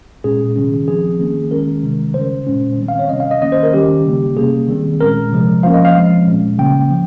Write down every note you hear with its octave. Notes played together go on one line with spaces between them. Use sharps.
A#2 G#3 C#4 G#4
C3 D#3 G3 C#4
F3 C4 G#4
D#3 A#3 C#4
D#3 G#3 C#4 A#4
C3 D#3 G#3
C#3 G3 C#4 C5
A#2 G#3 C#4
D#3 G3 C4
F5
C#5
C3 G3 C#4 D#5
F5
D#5
D#3 A#3 C#4 D#5
C5
A#4
D#3 G3 C#4 G4
C#3 G3 A#3
C3 G3 A#3 C#4 G#4
D#3 G3 C4
A#2 G#3 C#4 A#4
C3 F3 G#3
F3 A#3 C#4 F5
D#5
F5
F3 G#3 C4
A#2 G#3 C#4
C#3 G3 A#3 C#4 G5
F3